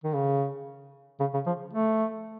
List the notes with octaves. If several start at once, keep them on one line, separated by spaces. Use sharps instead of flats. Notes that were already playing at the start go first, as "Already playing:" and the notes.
D#3
C#3
C#3
C#3
F3
A3